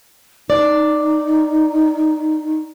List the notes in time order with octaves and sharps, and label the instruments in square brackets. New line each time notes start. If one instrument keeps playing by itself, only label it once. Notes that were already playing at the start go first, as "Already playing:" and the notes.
[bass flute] D#4 [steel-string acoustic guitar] D5